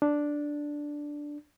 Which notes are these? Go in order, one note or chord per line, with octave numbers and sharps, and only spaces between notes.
D4